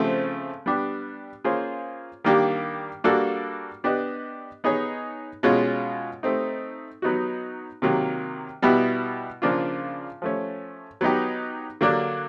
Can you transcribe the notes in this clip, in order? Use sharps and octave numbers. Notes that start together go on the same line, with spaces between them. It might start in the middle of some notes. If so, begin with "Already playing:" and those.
Already playing: C#3 F3 A3 C4
G3 B3 D4 G4
A#3 C#4 F4 G#4 C5
D#3 G3 A#3 D4 G4
G3 A#3 D4 F#4 A4
B3 D4 G4 B4 D#5
B3 D#4 G#4 C#5
B2 G#3 C#4 F4
A3 C4 D#4
F#3 B3 D#4 F#4
C3 D#3 F#3 A#3
B2 G3 B3 E4 G4
C#3 F3 A#3 D4 F4
F3 A3 C#4
F#3 B3 D#4 G4
D3 F#3 A#3 D4